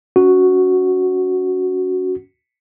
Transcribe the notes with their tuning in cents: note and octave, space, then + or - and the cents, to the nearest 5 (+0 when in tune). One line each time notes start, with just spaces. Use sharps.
C#4 +30 F#4 +0